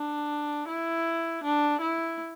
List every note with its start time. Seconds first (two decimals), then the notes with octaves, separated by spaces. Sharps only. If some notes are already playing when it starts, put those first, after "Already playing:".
Already playing: D4
0.68 E4
1.44 D4
1.81 E4